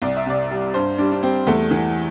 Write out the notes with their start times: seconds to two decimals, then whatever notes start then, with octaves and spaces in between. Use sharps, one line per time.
0.02 C2 D5
0.17 E5
0.26 C3 D5
0.51 G3
0.74 G2 C5
0.98 G3 D4
1.12 D4
1.23 G3 C4
1.47 E2 A3
1.71 E3